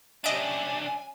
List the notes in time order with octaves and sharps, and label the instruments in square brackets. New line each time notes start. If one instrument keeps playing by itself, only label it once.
[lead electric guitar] C2 D4 [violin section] C#4 G4 E5 [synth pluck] D#5 D7 [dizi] G#5